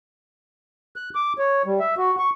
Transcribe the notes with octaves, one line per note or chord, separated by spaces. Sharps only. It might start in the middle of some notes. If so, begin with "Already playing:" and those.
F#6
D6
C#5
G3
E5
F#4
C#6